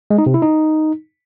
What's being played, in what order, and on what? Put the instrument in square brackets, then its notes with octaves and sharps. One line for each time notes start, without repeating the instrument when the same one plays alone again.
[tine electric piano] G#3
D#4
C3
E4
D#4